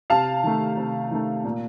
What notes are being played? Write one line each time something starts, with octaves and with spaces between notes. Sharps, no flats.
C3 F5 A5
D#3 A3
C3
D#3 A3
A#2